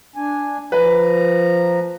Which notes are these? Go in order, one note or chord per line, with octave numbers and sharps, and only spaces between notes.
D4 G#5
F3 B4 A#5